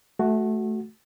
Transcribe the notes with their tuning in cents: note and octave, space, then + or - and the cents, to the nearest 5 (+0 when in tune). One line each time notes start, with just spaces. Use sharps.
A3 -15 F#4 +5